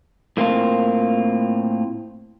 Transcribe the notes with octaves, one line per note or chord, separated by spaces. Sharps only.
A2 A#3 C4 F4